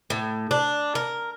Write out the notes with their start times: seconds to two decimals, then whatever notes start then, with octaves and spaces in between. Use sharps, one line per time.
0.10 A2
0.51 D4
0.95 A#4